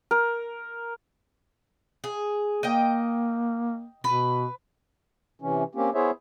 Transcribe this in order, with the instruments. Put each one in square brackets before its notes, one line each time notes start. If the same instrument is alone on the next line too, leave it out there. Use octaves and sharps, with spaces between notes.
[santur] A#4
[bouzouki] G#4
[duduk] A#3 [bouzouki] D#5 G5
[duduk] B2 [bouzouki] B4
[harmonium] C3 E3 C#4
A#3 C4 C#4 G4
B3 E4 G#4 C5 C#5 E5